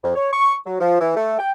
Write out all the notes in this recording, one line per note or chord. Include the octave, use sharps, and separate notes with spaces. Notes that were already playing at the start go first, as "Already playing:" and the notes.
F2
C#5
C#6
F#3
F3
E3
A3
G5